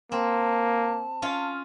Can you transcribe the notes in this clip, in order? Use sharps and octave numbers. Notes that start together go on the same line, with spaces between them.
A#3 C4 A5
C#4 F4 F5